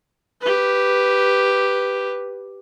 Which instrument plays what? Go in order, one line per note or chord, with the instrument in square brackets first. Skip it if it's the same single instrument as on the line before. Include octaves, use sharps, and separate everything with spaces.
[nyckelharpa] G4 B4